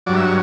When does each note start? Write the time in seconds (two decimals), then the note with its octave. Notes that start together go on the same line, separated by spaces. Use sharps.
0.06 G2 F#3 D5
0.17 E5
0.26 C#5